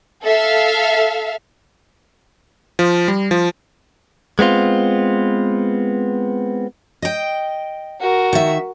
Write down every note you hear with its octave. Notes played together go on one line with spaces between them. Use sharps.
A4 E5 F5
F3
G3
F3
G#3 B3 C4 F4
D#5 G5
F#4 A#4
D#3 E5